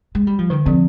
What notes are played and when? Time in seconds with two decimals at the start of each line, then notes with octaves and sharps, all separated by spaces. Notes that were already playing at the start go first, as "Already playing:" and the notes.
0.15 G#3
0.27 G3
0.39 F3
0.50 D3 D#3
0.66 D3 F3 C4